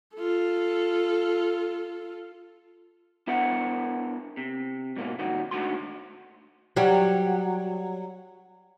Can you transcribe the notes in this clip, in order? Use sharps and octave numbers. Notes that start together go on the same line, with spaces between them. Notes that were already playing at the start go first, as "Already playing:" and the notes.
F4 A4
B3 D4 E4 A#4 F#5
C3
G#2 B2 A#3
A#2 D#3 F#4
G#2 D3 A3 F#4 C6
F#3 G3